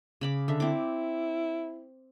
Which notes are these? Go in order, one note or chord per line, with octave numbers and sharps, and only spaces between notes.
C#3 B5 D6
D3 E5
C4 E4 D6